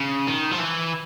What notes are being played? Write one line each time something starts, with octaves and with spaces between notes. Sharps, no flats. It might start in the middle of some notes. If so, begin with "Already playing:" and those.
Already playing: C#3
D#3
F3
E3